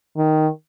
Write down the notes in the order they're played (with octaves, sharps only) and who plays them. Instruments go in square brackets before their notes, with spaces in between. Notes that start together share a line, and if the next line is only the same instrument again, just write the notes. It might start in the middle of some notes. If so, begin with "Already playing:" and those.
[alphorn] D#3